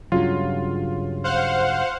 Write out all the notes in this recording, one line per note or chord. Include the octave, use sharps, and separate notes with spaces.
G2 C#3 F#3 F4
C5 F5 F#5